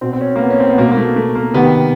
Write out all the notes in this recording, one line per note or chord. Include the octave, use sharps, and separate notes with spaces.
B2 C4
C4
C#4
A#3
B3
C#4
C4
B3
B2 A#3
A#3
A3
A3
A#3
C3 D#3 B3